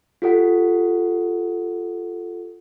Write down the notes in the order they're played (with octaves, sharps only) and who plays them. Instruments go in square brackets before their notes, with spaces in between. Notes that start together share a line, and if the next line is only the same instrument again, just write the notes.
[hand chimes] F4 G4 A4 F#5